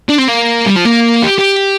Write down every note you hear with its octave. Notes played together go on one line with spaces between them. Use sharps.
D4
C4
A#3
G3
F3
A#3
G4
G4